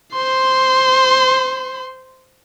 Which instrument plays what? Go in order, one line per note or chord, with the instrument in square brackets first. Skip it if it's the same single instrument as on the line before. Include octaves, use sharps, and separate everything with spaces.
[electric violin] C5 C6